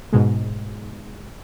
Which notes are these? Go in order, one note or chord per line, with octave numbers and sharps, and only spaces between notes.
G#2 B2 G#3